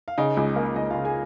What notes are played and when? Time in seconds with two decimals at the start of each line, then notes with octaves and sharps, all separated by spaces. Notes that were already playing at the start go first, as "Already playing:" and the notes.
0.08 F5
0.18 C#3 D#4 D#5
0.37 C#2
0.56 A#3
0.76 C#2 D#4 D#5
0.90 F4 F5
0.94 C#3
1.05 G#4 G#5